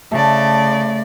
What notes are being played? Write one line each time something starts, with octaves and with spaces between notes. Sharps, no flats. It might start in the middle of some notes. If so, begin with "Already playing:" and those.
C#3 A3 D5 A5